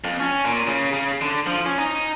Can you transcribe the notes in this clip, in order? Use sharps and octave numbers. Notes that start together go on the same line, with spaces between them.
F2
C#4
A#2
C#3
C#3
D3
F3
C#4
D#4